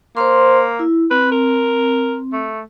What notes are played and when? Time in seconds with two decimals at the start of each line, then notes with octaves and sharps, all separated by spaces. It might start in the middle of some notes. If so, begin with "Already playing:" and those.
0.17 A#3 C5 A#5 C6
0.79 E4
1.11 C4 B4
1.32 A#4
2.33 A3